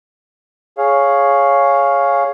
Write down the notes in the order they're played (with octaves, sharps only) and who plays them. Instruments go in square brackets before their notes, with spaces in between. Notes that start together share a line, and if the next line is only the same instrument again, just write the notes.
[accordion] G#4 C#5 F5